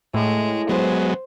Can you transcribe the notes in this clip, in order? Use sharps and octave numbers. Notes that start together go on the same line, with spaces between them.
A2 G#3
F#3 G#3 B3 C5